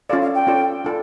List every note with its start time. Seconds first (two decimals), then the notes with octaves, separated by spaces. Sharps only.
0.10 C#4 F4 A4 D5 F5
0.22 F5
0.35 G5
0.47 C#4 F4 A4 D5
0.85 D4 F4 A4